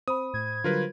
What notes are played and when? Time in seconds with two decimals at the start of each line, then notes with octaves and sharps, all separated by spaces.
0.08 C4 C5 B5 D#6
0.34 A2 G#6
0.64 D3 F#3 G3 F4 A#4 B4